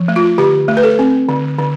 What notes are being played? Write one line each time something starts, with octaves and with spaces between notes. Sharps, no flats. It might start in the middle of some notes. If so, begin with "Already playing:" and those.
Already playing: F3
A3
F4
D3 G4
A3
B4
A4
C4
D3
D3